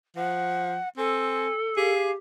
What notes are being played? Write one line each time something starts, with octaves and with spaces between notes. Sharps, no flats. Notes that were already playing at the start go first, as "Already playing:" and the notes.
F3 F#5
C4 A4 G#5
G4 G#4 F5